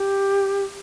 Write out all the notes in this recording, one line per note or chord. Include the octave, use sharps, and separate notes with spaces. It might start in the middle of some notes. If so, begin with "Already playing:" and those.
Already playing: G4